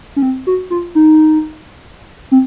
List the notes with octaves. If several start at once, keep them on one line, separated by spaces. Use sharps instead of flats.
C#4
C4
F#4
F4
D#4
C4